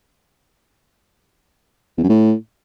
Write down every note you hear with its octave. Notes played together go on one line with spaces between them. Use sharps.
E2
F#2
A2